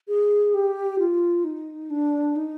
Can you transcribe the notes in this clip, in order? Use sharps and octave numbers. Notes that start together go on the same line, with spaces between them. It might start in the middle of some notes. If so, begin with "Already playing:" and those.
G#4
G4
F4
D#4
D4
D#4